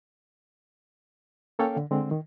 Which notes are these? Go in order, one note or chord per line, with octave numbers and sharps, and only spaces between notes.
A#3 C#4 A4 C#5 F5 G5
D3
D3 G#3 C4
D#3